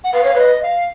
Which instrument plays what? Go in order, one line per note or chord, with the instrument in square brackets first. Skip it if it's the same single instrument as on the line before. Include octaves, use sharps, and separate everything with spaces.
[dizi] F#5
[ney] B4 [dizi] F5
[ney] C#5 [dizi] F5
[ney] B4 [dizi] D#5
[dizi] F5